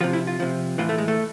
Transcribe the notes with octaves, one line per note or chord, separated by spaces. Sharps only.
C3 F3 F4
E4
F4
C3 F3
A2 E3 F4
A3
G#3
A3